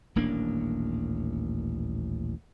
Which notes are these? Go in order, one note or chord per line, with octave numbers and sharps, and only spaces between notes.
D#1 A1 A#3 D4